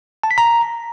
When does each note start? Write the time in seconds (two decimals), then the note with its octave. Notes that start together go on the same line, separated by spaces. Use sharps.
0.23 A5
0.31 B6
0.38 A#5